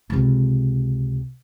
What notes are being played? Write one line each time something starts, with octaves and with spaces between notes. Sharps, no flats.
C#2 C3